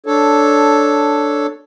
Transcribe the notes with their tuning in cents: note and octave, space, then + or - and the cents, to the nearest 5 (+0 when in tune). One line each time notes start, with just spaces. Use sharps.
D4 +0 A4 +0 C#5 +0